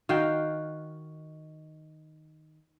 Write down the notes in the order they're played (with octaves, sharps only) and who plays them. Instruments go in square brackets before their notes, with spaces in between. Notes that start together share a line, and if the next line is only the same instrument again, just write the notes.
[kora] D#3 F#4 F5 G5